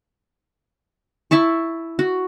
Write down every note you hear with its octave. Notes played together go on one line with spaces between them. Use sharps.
E4 E5 A5 C#6
F#4